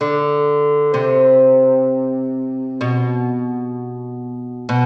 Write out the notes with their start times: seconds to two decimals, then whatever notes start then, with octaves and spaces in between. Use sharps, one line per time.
0.01 D3
0.94 C3
2.81 B2
4.69 B2